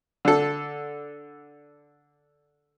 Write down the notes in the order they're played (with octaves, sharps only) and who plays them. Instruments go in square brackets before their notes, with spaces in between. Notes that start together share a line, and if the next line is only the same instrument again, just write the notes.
[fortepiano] D3 A4